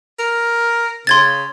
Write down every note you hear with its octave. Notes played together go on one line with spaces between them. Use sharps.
A#4
C#3 C6 G#6 A6